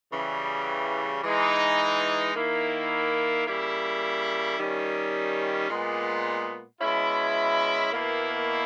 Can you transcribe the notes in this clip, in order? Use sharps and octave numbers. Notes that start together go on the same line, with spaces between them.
C#3 E3 G3
E3 G#3 D#4
D#3 A#3 E4
C#3 G3 A#3 E4
D#3 G3 C#4
A#2 G#3 B3
B2 G#3 C#4 E4
B2 A#3 E4